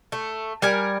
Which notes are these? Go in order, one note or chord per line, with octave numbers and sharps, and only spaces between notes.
A3
G3 A#4 G#5